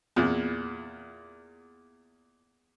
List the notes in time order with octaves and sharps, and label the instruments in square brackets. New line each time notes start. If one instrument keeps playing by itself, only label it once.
[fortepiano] E2 A#2